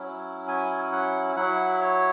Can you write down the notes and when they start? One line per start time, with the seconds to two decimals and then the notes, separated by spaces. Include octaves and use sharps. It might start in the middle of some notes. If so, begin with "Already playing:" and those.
Already playing: F#3 C#4 E4
0.48 G#5
0.92 F#5
1.36 F#3 E4 F#5
1.81 C#5